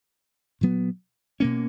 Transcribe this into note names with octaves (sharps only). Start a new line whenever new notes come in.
A#2 F#3 B3
B2 A#3 C#4